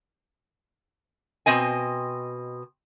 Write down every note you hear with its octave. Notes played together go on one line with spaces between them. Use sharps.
B2 C4 D#5 G#5